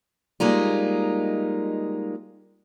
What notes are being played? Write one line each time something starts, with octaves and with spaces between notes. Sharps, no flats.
G3 G#3 A#3 D#4 F4